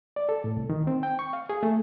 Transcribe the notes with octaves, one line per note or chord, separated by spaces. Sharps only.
D5
A4
A2
C2
D#3
C4
G5
C#6
F5
G#4
A3